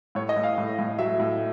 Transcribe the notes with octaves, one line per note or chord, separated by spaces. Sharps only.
A2 C#5
D#5
A2
F5
A2
A2
F#3 E5
A2